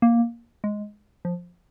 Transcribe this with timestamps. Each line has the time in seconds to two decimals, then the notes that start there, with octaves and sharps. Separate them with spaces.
0.02 A#3
0.64 G#3
1.25 F3